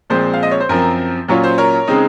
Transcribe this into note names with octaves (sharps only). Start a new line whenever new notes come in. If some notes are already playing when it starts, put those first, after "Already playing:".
A#2 F3 G#3 C4 C5
F5
D#5
C#5
C5
F#2 F3 C4 A#4
A#2 F#3 C#4 F4
C5
A#4 C#5
C#3 G#3 C4 D#4